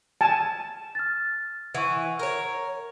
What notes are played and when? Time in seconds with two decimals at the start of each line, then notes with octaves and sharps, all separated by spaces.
0.21 G#5 A5
0.95 F6 A6
1.75 E3 F#5 C#6
2.19 A#4 C#5